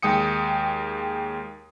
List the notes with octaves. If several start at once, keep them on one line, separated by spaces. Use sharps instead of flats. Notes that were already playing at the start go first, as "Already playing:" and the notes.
D#2 G#3 G5 D#6 C#7